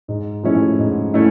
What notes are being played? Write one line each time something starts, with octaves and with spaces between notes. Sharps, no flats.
G#2
F3 A3 C#4 E4
G#2
A3 C#4 E4